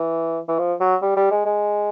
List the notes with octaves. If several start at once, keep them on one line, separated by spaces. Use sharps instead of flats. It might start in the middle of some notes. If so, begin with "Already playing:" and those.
Already playing: E3
E3
F3
F#3
G3
G3
G#3
G#3